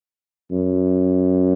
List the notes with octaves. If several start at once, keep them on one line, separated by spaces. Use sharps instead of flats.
F#2